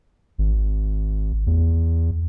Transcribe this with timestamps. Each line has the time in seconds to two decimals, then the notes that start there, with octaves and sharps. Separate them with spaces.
0.38 G#1
1.46 E2